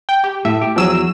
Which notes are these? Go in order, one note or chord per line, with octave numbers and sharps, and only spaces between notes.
G5
G4
A2 E5
G4
E2 F3 F#3 G#4 E6 E7